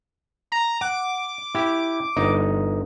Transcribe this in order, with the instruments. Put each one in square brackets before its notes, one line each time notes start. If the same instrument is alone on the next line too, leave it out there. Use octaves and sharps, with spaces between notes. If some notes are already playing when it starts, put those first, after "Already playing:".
[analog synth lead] A#5
[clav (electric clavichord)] F#5 [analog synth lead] D6
[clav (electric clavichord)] E4 G4
G1 D#4